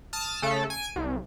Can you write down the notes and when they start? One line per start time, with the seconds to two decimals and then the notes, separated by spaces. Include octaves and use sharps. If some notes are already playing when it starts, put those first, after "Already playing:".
0.13 A5 D#6 F6
0.42 C#3 A3 A4
0.70 G#5 D7
0.96 C2